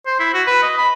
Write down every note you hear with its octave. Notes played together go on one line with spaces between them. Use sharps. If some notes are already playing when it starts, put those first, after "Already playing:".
C5
E4
F#4
B4
D#5
B5